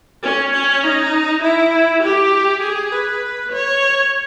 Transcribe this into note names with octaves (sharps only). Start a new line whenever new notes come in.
C#4
C#4
D#4
E4
G4
G#4
B4
C#5